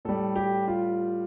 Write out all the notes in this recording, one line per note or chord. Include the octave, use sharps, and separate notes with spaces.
A2 G3 A4
G4
F4